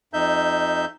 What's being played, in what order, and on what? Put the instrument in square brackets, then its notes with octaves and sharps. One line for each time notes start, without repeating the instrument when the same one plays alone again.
[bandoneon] F2 D#4 E5 G6